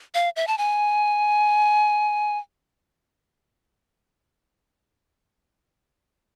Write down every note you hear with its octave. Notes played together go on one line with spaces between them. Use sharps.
F5
E5
A5
G#5